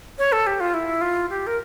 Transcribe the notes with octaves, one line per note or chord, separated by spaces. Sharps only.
C#5
A4
G4
F4
E4
F4
G4
A#4